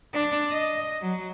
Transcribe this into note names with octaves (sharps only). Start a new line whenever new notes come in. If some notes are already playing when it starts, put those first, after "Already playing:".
D4
D#5
F#3